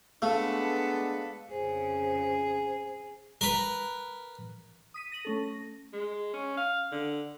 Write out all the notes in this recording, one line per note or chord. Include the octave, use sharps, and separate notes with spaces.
G#3 A3 B3 D4 A4 B4 F5
F2 C#3 G#4 C5
A#4 B4
D#6 B6 D#7
A#6 D#7 F#7
A3 C#4 A4
A#6
G#3
C#4
F5
D3